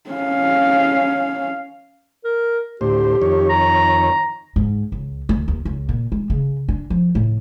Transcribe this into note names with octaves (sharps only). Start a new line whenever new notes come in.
C#4 F5
A#4
D2 A2 G4 C5
F2 D#3 C#5
A#5
G#2
C#2
D2
D#2
C#2
A#2
G#3
C#3
D4
F3
A2